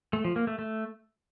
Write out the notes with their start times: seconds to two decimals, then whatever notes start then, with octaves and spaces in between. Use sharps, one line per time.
0.13 A3
0.25 F3
0.36 A#3
0.47 A3
0.59 A3